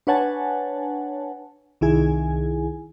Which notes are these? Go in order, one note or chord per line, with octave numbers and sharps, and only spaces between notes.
D4 B4 C#5 F#5 G#5 A5
C2 D#3 E4 G#4 G#5